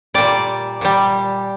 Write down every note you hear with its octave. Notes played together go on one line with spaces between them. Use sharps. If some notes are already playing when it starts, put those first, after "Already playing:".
A#2 G3 D5
A#2 G3